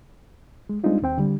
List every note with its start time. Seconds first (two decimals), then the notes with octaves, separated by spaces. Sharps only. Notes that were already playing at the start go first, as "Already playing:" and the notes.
0.69 G#3
0.84 G3 G#3 C4 D4 D#4 F4
1.02 D#2 C4 G5
1.18 D3 G3